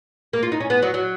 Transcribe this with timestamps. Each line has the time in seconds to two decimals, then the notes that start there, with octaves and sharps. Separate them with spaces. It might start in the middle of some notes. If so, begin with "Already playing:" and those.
0.33 A#3
0.43 F4
0.52 D#4
0.60 C#4
0.70 B3
0.82 F#3
0.94 F#3